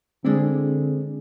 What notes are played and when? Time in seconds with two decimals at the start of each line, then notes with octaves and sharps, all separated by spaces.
0.25 D3 G#3 C4 D4 E4